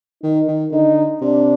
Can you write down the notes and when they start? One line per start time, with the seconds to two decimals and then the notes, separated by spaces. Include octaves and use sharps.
0.23 D#3 D#4
0.48 D#3
0.72 D3 D#4
1.21 C3 D4